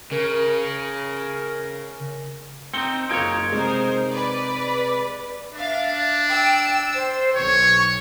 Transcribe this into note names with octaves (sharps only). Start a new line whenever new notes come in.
C#3 A#4
C4 D#4 C#7 G7
F#1 D#4 F4 C#5 G#6 D7
C3 G#3 D#4 A#4 C5
B4 D5
D4 E5 F5
G5 E6
C5
B1 C#5 C#6